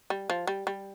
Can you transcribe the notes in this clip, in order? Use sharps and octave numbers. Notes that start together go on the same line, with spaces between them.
G3
F3
G3
G3